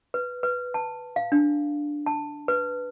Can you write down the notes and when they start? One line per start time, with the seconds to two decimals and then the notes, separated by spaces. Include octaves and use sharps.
0.14 B4
0.43 B4
0.74 A5
1.16 F5
1.32 D4
2.06 A5
2.48 B4